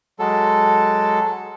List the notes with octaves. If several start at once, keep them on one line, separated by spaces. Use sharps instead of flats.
F#3 G#3 A4